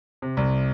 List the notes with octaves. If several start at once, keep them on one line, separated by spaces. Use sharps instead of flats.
C3
C2